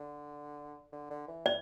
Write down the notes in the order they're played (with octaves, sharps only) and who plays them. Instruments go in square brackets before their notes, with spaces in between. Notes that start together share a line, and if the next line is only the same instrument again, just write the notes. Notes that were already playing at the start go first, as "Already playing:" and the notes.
Already playing: [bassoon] D3
D3
D3
E3
[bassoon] E3 [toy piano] D5